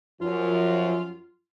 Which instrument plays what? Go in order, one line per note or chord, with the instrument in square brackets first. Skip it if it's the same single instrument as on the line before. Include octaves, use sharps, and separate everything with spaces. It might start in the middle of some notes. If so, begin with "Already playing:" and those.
[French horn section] F#2 F3 [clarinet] F4